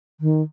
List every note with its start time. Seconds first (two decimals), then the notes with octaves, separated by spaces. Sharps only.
0.20 D#3